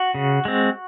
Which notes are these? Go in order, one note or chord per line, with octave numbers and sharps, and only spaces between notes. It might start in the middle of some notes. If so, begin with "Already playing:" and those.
Already playing: F#4
C#3
G#3 C4